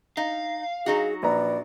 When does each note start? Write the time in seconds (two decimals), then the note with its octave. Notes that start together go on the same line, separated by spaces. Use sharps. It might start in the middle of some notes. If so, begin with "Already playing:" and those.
0.17 D#4 F5
0.86 F#3 D#4 F#4 G#4
1.23 A#1 B4 D5 A#5